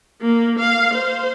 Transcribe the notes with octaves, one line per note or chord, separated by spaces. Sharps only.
A#3
F5
C5